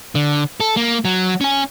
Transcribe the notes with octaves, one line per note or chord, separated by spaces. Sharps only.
D3
A4
A#3
F#3
C#4 G#5